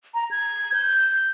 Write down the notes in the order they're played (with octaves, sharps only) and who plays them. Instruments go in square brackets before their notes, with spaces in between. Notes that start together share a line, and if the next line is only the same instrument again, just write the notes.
[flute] A#5
G#6
G6